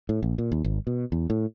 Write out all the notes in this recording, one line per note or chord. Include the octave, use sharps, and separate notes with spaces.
A2
A#1
A#2
D#2
G#1
B2
E2
A2